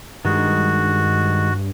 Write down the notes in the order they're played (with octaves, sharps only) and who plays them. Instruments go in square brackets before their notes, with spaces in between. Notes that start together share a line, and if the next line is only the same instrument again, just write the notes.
[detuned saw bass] G2 [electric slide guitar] D#3 G#3 [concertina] F#4